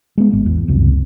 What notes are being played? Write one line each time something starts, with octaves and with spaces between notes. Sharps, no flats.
G#3 B3
G#1
E2
G1 C#2 F#2 C3